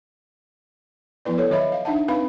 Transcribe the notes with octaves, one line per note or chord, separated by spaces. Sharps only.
F3 B3 E4 B4 D5
A4 C#5
D#3 F#3 C#5 D#5 E5 B5
F5
D4 D#4 E5 F#5 A5
C4 D#4 B4 F5 B5